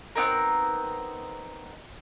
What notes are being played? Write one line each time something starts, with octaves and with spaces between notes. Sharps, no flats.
B3 C4 D#4 A#4